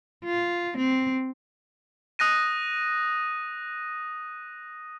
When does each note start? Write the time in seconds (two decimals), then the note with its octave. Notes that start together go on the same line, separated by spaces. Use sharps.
0.25 F4
0.78 C4
2.19 D#6 F#6 A#6 D#7